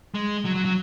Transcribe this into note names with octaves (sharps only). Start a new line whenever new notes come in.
G#3
F#3
F#3
F#3